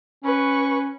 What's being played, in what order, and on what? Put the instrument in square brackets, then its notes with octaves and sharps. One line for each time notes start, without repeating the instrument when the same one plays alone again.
[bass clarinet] C#4 [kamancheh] B4 C#6